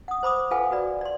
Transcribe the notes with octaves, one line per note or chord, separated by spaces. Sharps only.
F#5 D#6
C5 B5 D6 D#6
F4 A4 B4 F5 F#5 G#5
F#4 B4 D5
D5 C6